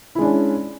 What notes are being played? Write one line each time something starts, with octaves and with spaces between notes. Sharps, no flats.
G#3 C#4 D4 E4